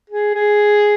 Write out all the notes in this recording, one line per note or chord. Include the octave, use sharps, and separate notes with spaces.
G#4
G#4